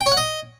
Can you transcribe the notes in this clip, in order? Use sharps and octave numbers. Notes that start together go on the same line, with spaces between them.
G5
C#5
F#5
D#5